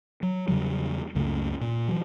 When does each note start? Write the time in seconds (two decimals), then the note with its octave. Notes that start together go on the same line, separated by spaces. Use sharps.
0.23 F#3
0.48 E2 C#3 F#3 G3
1.15 C#2 F#2 C#3 A3
1.61 A#2
1.88 E3 F#3